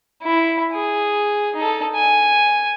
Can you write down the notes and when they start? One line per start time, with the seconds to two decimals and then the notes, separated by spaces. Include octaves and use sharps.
0.23 E4
0.73 G#4
1.56 D#4 A4
1.95 G#5